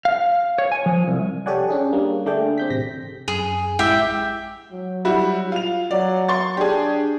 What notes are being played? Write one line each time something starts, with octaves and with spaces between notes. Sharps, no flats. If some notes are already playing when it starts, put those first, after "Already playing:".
F5
C#5
G#5
F3
C2
G4 A4 C#5 D5 F#5 G#5
C#4 D4 G#4
G3 A#3
D3 A3 G#4 D5 G5
C4 G6 B6
A1 C3 A#6 B6
F#2 G#4
A1 G#3 E4 G4 E5 G5
F#3
G3 E4 F#4
F4 F7
F#3 D5
C6 C#6 A6
D4 G4 G#4